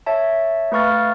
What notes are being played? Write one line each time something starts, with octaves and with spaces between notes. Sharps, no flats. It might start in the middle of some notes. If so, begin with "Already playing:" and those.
C#5 E5 A5
A3 B4 F5 C#6 F6 A6